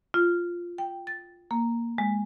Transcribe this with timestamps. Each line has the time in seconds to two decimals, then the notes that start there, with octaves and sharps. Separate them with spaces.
0.14 F4
0.78 G5
1.07 A6
1.51 A#3
1.98 G#3